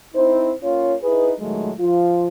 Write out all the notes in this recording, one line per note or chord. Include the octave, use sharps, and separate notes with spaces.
C4 D#4 E4 C5
A#3 C#4 F4 C#5
D#4 E4 G#4 B4
A#2 D#3 F#3 G#3 A3
F3 F4